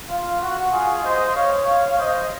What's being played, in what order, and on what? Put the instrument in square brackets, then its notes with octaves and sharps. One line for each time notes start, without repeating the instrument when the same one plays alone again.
[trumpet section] F4
F#4
F4 G#4
C5 D#5
C#5 F5
C#5 F5
C5 D#5